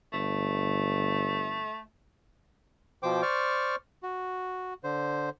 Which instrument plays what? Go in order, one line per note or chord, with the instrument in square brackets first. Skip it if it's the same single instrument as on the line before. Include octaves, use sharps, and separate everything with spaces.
[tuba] G1 [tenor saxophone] A3
[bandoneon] B2 F3 C5 G5 D6
C5 D5 C#6 F6
F#4
D3 C5